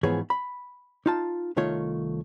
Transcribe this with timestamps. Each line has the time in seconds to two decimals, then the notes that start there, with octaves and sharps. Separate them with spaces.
0.03 G#2 E3 F3 B3 G#4 C#5
0.30 B5
1.06 D#4 F4 A5
1.56 C2 D#3 A3 F4 C#5